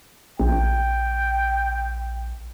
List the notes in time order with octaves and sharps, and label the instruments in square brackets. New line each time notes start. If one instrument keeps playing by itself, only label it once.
[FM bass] A#1 [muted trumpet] G5